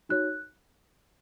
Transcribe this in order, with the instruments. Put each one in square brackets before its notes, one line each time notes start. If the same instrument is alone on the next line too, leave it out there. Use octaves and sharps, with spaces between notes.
[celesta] D#4 F#4 C#5 F#6